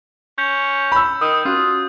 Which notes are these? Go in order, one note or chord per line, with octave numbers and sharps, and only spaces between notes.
C#4 G6
B5 E6
D#3 D#6
C#4 F4 F#4 F#6